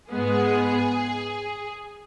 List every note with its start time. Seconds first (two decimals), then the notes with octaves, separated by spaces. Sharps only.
0.10 G#2 G#3 B3 G#4